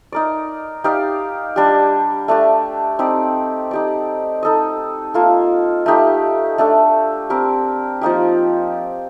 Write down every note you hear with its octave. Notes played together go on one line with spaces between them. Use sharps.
D#4 A#4 D5
D#4 G4 D5 F5
G3 D4 G4
A3 D4 G4
C4 D#4 G4 D5
D#4 G4 D5
D#4 A4 D#5
A#3 F4 A4
A3 D#4 G4
A3 D4 A4
C4 G4 A#4
F3 A#3 D#4 G4